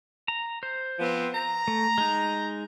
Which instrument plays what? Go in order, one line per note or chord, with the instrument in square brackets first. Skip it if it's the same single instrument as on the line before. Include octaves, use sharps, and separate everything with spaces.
[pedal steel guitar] A#5
C5
[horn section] F3 B3 C4
A#5
[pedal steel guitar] A3
G#3 D#4